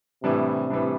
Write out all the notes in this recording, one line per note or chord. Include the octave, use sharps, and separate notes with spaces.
A2 C3 E3 G3 D4
A2 E3 G3 D4